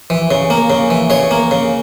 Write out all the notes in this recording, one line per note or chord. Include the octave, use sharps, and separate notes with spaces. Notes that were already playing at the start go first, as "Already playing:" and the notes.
E3
C#3
A#3
C#3
E3
C#3 C#5
A#3
C#3